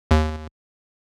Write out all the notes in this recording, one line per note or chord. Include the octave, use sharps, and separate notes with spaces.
D#2